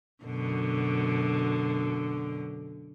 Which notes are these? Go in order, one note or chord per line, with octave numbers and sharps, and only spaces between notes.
F#2 B2 D3